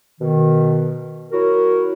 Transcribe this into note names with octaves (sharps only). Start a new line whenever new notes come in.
B2 D#3
F#3 E4 F#4 A#4